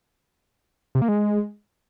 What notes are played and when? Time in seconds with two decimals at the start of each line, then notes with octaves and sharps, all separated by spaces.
0.95 C3
1.02 A#3
1.08 G#3